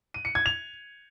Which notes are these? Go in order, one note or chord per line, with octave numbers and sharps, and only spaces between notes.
D#7
C#7
G#6
F7